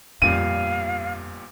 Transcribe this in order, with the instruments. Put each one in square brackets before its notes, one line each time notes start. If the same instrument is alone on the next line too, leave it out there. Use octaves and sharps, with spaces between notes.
[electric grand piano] G1 A#2 G3 [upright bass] F2 [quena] F5 [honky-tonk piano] D#7